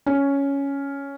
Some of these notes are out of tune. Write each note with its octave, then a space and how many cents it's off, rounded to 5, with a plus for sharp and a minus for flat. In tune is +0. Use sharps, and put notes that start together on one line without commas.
C#4 +5